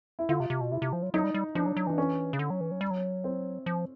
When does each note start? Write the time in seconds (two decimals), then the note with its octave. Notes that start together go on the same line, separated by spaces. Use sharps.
0.19 E4
0.29 D3 F4
0.40 C3
0.50 C3
0.61 B2
0.71 C3 E4
0.82 C3
0.93 F3
1.02 F#3
1.14 F#3 D#4
1.24 G3
1.34 G3
1.55 F3 D4
1.66 F#3
1.77 F#3
1.87 E3 D4
1.98 C#4
2.33 C#3
2.39 D3
2.50 F#3
2.61 E3
2.71 F#3
2.81 G3
2.91 F#3
3.24 C4
3.66 F3